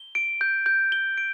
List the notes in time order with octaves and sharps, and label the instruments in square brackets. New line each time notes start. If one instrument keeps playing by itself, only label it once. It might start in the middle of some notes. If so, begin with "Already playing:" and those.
Already playing: [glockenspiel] G7
D7
G6
G6
G7
D7